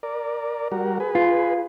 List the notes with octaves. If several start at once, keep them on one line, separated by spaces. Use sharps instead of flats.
A#4 D5
G3 F#4 A#4
G#4 B4
F4